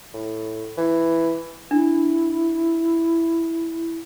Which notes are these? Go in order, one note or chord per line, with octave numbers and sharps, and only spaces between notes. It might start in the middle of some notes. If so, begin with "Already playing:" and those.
A2
E3
D4 E4